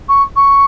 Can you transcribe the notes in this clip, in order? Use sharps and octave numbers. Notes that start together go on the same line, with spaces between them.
C#6
C#6